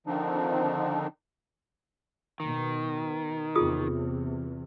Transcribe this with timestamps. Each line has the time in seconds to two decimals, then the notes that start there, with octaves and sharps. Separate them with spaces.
0.07 D3 D#3 F3 C4 D4 D#4
2.40 B2 D#3
3.55 E2 C3 F4 G#4 D#6